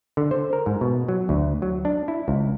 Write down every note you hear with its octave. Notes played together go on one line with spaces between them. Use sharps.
D3
C5
A#4
G#2
B2
F#3
D2
F#3
D4
E4
C#2